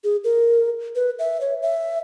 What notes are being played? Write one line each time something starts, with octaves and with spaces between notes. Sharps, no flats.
G#4
A#4
B4
E5
C#5
E5